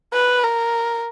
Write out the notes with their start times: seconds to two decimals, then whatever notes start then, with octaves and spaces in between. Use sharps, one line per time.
0.13 B4
0.44 A#4